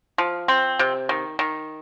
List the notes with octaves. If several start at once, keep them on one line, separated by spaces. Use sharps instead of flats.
F3
C4
C3
D#3
D#3